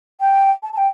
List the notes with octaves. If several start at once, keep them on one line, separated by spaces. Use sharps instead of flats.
G5
A5
A5
G5